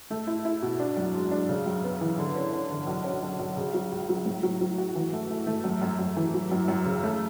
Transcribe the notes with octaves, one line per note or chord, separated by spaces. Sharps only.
A3
E4
E4
B2
D4
F#2
G#3
D4
C#3
F#2
B3
E3
D3
C#4
C#4
D3
B1
C#4
B1
B1
C#3
F#3
C#2
F#3
A2
F#3
F#3
F#4
E3
A3
A3
A3
F#2
F#2
F#2
E3
F#3
F#2
F#2
C#3
A3